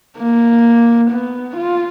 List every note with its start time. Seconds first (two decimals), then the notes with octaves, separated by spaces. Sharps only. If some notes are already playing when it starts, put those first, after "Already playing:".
0.17 A#3
1.10 B3
1.56 F4